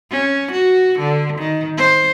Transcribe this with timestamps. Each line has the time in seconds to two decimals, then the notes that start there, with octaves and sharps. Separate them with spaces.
0.11 C#4
0.52 F#4
0.99 D3
1.38 D#3
1.77 C5